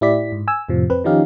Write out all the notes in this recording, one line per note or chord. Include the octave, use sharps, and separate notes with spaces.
A2 E4 G4 D5 B6
G#2
G#5 E6
F2 A2 C3 F3
F2 C4 B4
D#3 F3 C#4 D#4 G4 F5